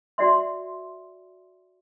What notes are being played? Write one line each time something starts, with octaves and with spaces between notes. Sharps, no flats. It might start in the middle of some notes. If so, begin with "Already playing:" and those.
F#4 D5 E5 C6